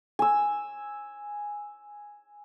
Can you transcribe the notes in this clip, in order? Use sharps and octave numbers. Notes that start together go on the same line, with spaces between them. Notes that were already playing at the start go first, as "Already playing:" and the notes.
G#5 E6